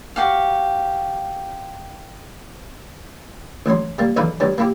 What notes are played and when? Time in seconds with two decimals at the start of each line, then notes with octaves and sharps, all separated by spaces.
0.16 F#4 G4 F5
3.66 A1 D2 F#3 C6
3.98 G3 A#3
4.16 B1 E2 D3 D#4 B4 F5
4.40 D2 G2 F#3 G3
4.58 A#3 E4 G4